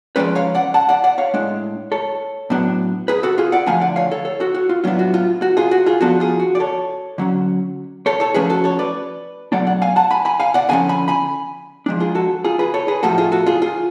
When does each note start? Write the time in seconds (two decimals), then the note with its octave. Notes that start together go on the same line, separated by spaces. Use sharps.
0.16 F3 G#3 C#4 B4 D5
0.35 C#5 F5
0.55 D5 F#5
0.74 F#5 A5
0.89 D5 F#5
1.04 D5 F#5
1.18 C#5 F5
1.34 A2 G#3 D4
1.92 A4 C#5
2.50 A2 F#3 B3 D4
3.08 G#4 B4
3.23 F#4 A4
3.38 F4 G#4
3.52 D5 F#5
3.66 D3 F3 A3 D4 F5 G#5
3.81 D5 F#5
3.96 C#5 F5
4.11 A4 C#5
4.25 A4 C#5
4.40 F#4 A4
4.54 F#4
4.69 F4
4.84 A2 F#3 B3 D4 F4
4.99 F#4
5.14 F4
5.42 F#4
5.57 F4 G#4
5.71 F#4
5.86 F4 G#4
6.01 F3 B3 D4 F#4 A4
6.20 F4 G#4
6.40 F#4
6.55 D5
6.60 A4 C#5
7.18 D3 F#3 C#4
8.06 A4 C#5
8.20 A4 C#5
8.34 F3 A3 C#4 G#4 B4
8.50 F#4 A4
8.64 A4 C#5
8.79 B4 D5
9.52 B2 F#3 A3 D4 D5 F#5
9.67 D5 F#5
9.82 F5 G#5
9.96 F#5 A5
10.11 G#5 B5
10.25 G#5 B5
10.40 F5 G#5
10.54 D5 F#5
10.69 D3 F3 A3 C#4 F5 G#5
10.89 G#5 B5
11.08 G#5 B5
11.86 F3 G#3 D4
12.00 F4 G#4
12.15 F#4 A4
12.44 F4 G#4
12.59 G#4 B4
12.74 A4 C#5
12.88 G#4 B4
13.03 A2 F3 A3 F#4 A4
13.18 F4 G#4
13.32 F#4 A4
13.46 F4 G#4
13.62 F4 G#4